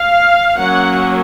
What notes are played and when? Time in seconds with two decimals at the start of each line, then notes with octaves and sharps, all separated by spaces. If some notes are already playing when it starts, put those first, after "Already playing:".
Already playing: F5
0.57 F#3 A#3 C#4 F#5